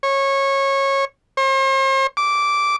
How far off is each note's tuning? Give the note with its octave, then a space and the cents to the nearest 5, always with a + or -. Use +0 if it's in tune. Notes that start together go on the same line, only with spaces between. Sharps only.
C#5 -20
C5 +45
D6 -10